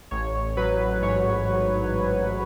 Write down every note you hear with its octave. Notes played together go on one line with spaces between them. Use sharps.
A1 C#5
F#3 B4
G#2 C#5